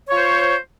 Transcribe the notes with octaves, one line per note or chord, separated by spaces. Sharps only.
F4 C5 C#5